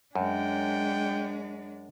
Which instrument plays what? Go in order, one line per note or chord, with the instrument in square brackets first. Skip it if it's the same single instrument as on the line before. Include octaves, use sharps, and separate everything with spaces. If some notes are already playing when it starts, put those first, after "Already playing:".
[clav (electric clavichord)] F#2 [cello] G#3 D4 [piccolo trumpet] G5